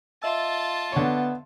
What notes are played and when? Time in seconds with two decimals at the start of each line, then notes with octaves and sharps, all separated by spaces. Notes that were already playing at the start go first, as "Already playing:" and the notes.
0.23 F4 D#5 E5 A5 E6
0.92 D3 B3 C#5